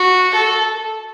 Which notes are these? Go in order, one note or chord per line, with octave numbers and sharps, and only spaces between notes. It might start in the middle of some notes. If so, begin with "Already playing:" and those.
Already playing: F#4
A4